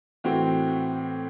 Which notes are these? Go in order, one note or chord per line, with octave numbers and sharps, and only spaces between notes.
A2 E3 C4 F#4